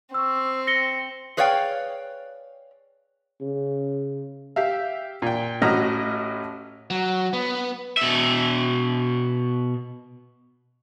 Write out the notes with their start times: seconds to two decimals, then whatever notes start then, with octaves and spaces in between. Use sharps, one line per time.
0.14 C4 C#6 E6
0.67 A#6 C#7 G7
1.37 G#4 B4 C#5 D5 F5 G5
3.41 C#3
4.56 G4 E5 F5
5.22 A#2 G5
5.62 A1 A2 F#4 D#5 A#5 F6
6.90 F#3
7.33 B3
7.97 B2 E5